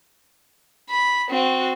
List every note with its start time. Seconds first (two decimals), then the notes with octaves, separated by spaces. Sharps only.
0.89 B5
1.30 C4 F#4